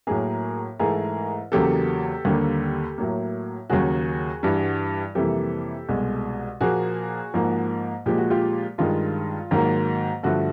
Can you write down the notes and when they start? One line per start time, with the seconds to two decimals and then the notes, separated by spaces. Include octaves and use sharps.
0.07 A2 F#3 A#3 G#4 A#4
0.79 G#2 E3 A3 G#4 A#4
1.52 E2 C#3 F#3 A#3 G4 A4
2.25 D#2 D3 G3 A#3
2.98 A2 F#3 A#3
3.70 D#2 C#3 F#3 F#4 G#4
4.43 G2 E3 G3
5.15 F2 C3 E3 G3 A#3 G4 A4
5.89 C2 B2 G#3
6.61 A#2 F3 A#3 F#4 G#4
7.34 G#2 F3 A#3
8.06 A#2 F3 G#3 G4
8.18 F#4
8.30 F4 G4
8.78 G2 D#3 G#3 F4
9.51 G#2 D#3 F#3 A#3
10.23 G2 D3 F3 A3 F#4